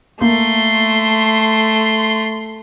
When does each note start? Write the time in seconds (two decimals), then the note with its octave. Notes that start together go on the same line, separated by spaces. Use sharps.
0.21 A3 A#3 C6